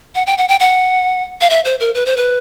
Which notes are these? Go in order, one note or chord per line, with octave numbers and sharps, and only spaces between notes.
F#5
G5
F#5
G5
F#5
F5
E5
C5
A#4
B4
C5
B4